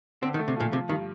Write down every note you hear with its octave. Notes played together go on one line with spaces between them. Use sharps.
D3 C4
D#3
A3
C3
A#2 F3
C3 F3
G2 D#3